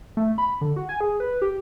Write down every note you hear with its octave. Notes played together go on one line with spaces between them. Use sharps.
A3
B5
D3
F#4
G#5
G#4
B4
G4